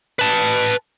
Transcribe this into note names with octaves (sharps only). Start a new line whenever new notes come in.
B4 A5